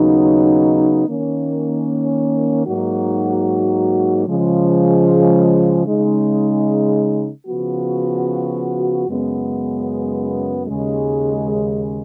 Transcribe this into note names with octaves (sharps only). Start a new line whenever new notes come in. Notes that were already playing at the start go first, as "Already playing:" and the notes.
Already playing: D#2 C#3 F#3 B3 D#4
D#3 A#3 C#4
G#2 F#3 A#3 D#4 F#4
C#3 F3 G#3
C#3 G#3 D#4
C#3 F3 B3 F#4
F#2 C#3 G#3 B3
D#2 C#3 G#3